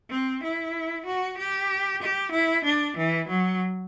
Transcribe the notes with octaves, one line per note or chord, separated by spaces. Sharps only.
C4
E4
F#4
G4
G4
E4
D4
E3
F#3